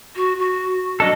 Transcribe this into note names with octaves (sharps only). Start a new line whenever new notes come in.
F#4
F#4
F#3 D4 A4 D#5